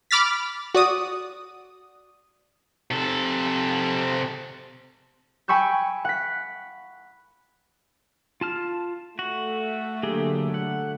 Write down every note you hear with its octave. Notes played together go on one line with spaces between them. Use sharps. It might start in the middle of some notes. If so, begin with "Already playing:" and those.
B5 D6 F6 A6 B6
F#4 D5 D#6
C3 A4
G5 G#5 B5 C#6 E6 G6
F#5 B6
F4 A5 F6
A3 F#4
D3 F#3 A#3 G4 G#4
F#5